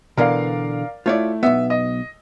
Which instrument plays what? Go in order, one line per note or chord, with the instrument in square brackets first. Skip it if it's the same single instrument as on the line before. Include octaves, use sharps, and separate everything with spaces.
[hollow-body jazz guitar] B2 D3 E3 [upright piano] A#4 D5 F5
[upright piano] A3 E4 [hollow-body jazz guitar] F4 C#5 D5
[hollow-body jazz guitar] B1 B3 [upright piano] E5
[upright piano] D#5